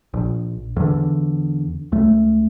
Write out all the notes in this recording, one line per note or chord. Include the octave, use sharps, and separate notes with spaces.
A#1
E2 D3
C#2 A3